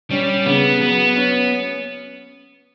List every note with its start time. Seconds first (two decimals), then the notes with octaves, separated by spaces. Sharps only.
0.11 G3 C#4
0.46 C#3 B3
0.81 F#3 B3
1.16 C#4